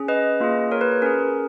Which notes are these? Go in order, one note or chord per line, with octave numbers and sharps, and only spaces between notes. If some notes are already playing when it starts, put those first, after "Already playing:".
Already playing: C#4 G#4
B4 D#5
A#3 F4 G#4
A#4 C#5
B4
B4
C#4 G#4 A#4